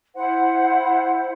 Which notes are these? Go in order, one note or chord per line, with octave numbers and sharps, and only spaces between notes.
E4 C5 F#5